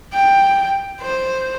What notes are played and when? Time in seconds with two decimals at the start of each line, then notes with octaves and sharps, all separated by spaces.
0.13 G5
1.01 C5